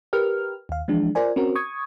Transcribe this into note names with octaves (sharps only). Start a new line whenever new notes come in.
G4 A#4 B4 F6
D#2 F5
E3 F3 G#3 D4
F4 A#4 C5 D5 G#5
C4 C#4 F#4 A#4
C#6 D#6 G#6